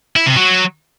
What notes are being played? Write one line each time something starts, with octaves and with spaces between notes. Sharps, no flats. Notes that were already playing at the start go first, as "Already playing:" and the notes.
E4
C3
F#3